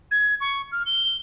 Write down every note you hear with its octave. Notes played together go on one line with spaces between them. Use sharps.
G#6
C#6
F6
G7